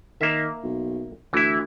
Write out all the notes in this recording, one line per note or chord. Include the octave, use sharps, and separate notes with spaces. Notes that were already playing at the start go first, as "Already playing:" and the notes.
D#3 A#3 E5
B1
D2 E3 E4